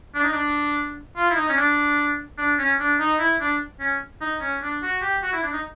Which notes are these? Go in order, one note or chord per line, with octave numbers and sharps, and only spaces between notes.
D4
D#4
D4
F4
E4
D#4
C#4
D4
D4
C#4
D4
D#4
E4
D4
C#4
D#4
C#4
D4
F#4
G4
F#4
E4
D4
D#4